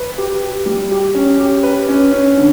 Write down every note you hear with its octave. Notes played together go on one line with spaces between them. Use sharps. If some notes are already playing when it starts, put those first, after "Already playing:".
Already playing: B4
G4
G4
G3
G4
C#4
G4
B4
C#4
C#4
D3